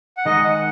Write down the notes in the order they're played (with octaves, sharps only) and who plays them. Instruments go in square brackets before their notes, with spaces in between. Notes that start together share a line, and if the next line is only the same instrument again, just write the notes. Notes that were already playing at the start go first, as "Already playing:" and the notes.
[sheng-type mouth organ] F#5
[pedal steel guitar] D#3 G#3 D#4 [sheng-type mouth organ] D#5
[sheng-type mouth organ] F#5